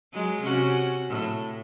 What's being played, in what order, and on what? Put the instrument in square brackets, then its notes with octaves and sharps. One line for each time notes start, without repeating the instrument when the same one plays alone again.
[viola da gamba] F#3 G#3
C3 C#4 F#4
A2